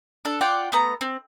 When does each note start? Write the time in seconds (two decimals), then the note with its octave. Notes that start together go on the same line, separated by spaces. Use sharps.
0.25 D4 A4
0.41 F4 D5 F#5 G5
0.72 A3 B3 A#5
1.01 C4